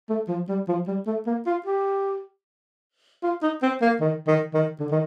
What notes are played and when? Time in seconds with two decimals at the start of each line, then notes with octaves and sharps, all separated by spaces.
0.10 A3
0.28 F3
0.48 G3
0.68 F3
0.87 G3
1.06 A3
1.27 A#3
1.46 F4
1.66 G4
3.23 F4
3.42 D#4
3.62 C4
3.81 A#3
4.00 D#3
4.27 D#3
4.53 D#3
4.80 D3
4.91 D#3